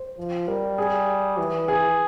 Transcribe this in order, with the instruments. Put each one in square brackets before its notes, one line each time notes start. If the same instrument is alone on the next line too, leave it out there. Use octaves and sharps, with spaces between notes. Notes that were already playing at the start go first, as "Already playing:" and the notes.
Already playing: [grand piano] C5
[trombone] F3
[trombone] G3 [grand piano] A#4
[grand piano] G#4
[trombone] E3
[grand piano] G#4